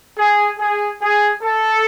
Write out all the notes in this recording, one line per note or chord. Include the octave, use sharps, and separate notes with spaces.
G#4
G#4
G#4
A4